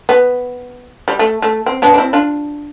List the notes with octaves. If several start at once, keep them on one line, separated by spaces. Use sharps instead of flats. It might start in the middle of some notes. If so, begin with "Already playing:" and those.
B3
G3
A3
A3
C4
B3 D4
D4
C4 E4
D4 F4